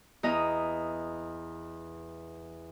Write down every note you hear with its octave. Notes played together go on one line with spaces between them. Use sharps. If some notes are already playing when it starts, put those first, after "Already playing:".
E2 D#5 A#5